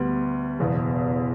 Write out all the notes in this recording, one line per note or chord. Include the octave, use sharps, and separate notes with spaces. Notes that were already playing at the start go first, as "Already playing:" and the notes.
Already playing: D2 G3 B3
F#1 E2 B2